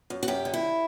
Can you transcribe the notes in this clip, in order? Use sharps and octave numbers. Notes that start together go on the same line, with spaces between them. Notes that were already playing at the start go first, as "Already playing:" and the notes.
F#2
F#4
F#2 G4
D3
E4